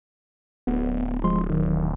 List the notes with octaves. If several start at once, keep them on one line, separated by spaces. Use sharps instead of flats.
D1 B3
F3 G#3 C6
D#3 F#3